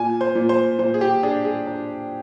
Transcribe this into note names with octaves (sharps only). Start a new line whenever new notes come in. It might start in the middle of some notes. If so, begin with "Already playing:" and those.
Already playing: A#2 G#5
C5
A#2
C5
A#2 C5
G#4
G4
D4 G#4
G#4
D4